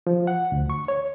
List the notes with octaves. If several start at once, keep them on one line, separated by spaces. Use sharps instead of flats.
F3
F#5
D2
C#6
C#5